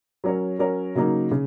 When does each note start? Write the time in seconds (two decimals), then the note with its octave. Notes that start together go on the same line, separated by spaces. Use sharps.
0.24 F#3 C#4 A#4 C#5
0.59 F#3 C#4 A#4 C#5
0.95 C#3 F#3 A#3 D#4 A#4
1.31 C#3